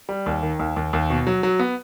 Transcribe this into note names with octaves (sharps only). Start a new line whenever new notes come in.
G3
D#2
D#3
D#2
D#2
D#2
B2
F#3
F#3
B3